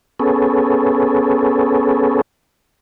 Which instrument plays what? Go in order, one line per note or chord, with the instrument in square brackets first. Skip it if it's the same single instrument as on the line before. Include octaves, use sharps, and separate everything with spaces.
[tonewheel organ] B3 C#4 G#4 A4